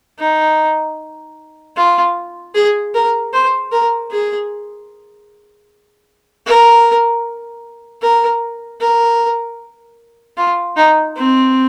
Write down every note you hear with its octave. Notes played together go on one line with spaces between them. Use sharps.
D#4
F4
G#4
A#4
C5
A#4
G#4
A#4
A#4
A#4
F4
D#4
C4